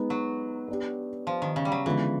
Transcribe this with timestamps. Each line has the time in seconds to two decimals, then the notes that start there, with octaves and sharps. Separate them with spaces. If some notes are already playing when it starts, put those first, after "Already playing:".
Already playing: G#3 B3 D#4
0.10 F#3
0.68 B3 D4 G4
1.27 F3
1.42 D#3
1.56 C#3
1.65 G3
1.72 F#3
1.86 D3 E3 F3 G#3 B3